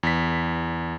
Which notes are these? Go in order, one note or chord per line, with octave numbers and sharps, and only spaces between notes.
E2 B6